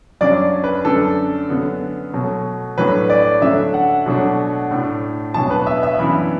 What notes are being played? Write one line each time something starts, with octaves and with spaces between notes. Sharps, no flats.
F#2 F#3 D4 D5
B4
F#2 D3 A3 D4 A4
F#2 D3 B3
B2 F#3 A3
A2 F#3 A3 D4 B4
D5
D3 F#3 A3 D4 E5
F#5
B2 F#3 A3 D4
A2 A3 D4
B2 F#3 B3 D4 A5
B4
E5
E5
F#2 E3 B3 D4 B5